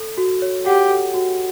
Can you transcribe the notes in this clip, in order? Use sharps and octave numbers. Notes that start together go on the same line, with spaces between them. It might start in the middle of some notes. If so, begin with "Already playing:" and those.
Already playing: A4
F#4
C#5
G4 F#5
A4
F#4